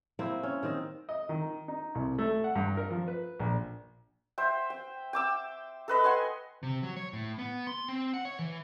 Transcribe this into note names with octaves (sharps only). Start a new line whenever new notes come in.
A#3 C4 E4
C#4
D#3 C4 D#5
D#5
D#3
D#4
C2
A3
F#5
G2
A#4
F3
B4
A#1
C5 E5 G5
G5
G5 D6 E6
A4 B4 D#5
F#5 G#5 C6
C3
F#3
C#5
A2
B3
C6
C4
F#5
C#5
E3